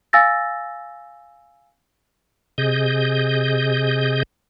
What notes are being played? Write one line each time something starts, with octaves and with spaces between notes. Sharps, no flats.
F5 G#5 E6 A6 A#6
C3 G#4 D#5 G6